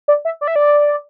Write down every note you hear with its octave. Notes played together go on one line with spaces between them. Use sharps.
D5
E5
D5
E5
D5